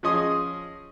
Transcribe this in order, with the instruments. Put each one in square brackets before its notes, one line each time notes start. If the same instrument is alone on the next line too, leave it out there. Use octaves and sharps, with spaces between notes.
[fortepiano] F3 C#4 G#4 D#5 C6 D#6